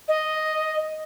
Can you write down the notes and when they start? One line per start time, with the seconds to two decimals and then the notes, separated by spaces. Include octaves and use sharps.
0.08 D#5